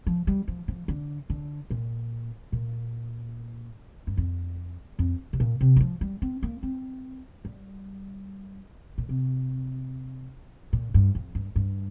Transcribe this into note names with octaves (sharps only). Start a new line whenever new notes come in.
F3
G3
F3
F3
D3
D3
A#2
A#2
G2
F2
F2
C3
A#2
C3
G3
F3
G3
C4
A#3
C4
G3
A#2
C3
A#2
G2
F2
G2
G2